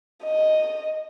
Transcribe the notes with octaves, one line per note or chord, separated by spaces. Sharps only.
D#5